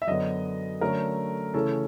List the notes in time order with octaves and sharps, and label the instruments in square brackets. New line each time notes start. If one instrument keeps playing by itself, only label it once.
[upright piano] E5
F#2 D3 F#3 B3 D#5
D3 F#3 A3 C#4 A#4
C#3 E3 A3 C#4 A4